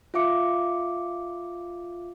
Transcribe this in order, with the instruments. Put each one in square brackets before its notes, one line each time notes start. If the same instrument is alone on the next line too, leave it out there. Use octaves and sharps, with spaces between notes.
[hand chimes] F4 E5 F5 D6 C#7